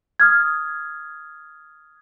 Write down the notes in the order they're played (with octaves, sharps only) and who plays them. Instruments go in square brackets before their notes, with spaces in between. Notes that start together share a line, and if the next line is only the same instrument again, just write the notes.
[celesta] D#6 F6 G#6